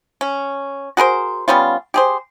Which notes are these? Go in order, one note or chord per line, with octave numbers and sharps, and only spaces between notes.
C#4
F#4 G#4 A#4 C5
G3 B3 C#4 F4
G4 G#4 C5